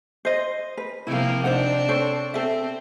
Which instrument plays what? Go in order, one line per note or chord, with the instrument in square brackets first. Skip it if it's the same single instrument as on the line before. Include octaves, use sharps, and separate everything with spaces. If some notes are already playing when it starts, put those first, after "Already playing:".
[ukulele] C5 D#5
B4
[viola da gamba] C3 F3 A#3 [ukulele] E4
[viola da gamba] C4 D4 [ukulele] D#4 C5 F#5
[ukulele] A4 C5 C#5
[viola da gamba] C4 [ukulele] A4 E5